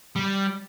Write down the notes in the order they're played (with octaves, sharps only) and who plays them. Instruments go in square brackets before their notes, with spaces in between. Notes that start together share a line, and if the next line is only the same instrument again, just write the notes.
[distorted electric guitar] G3